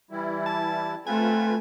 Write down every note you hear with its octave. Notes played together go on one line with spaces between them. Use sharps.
E3 G3 E4
A5
A3 C4 F4 B4 G#5